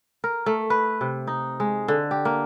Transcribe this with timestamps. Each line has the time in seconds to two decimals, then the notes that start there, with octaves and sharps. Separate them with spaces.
0.24 A#4
0.46 A3
0.70 B4
1.01 C3
1.27 D#4
1.60 G#3
1.88 D3
2.11 G4
2.25 A#3